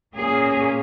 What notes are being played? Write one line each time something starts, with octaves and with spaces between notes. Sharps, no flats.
A#2 A#3 C#4 G#4